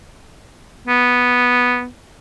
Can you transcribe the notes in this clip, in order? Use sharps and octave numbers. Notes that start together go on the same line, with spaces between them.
B3